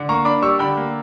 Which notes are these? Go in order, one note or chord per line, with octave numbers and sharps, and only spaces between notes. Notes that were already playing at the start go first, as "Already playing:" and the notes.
Already playing: D3
A#3 A#5 C#6
D4 B5 D6
G3 C#6 E6
D3 G5 B5
A#3